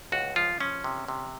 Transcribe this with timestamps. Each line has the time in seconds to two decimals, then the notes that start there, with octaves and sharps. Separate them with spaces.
0.12 C#2 F#4
0.36 F3 F4
0.60 F3 C#4
0.84 C3
1.08 C3